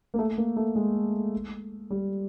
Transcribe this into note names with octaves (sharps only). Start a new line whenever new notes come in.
A#3
A3
A#3
A3
G#3
G3